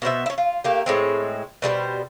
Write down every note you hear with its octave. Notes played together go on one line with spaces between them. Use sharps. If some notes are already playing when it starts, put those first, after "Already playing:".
B2 B3 C5 E5
C#4 E4
F4
A3 A#3 G4
A2 G#3 C4
B2 G3 G#4 C5